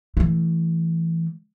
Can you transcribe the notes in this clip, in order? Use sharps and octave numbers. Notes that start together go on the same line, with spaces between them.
E3 A3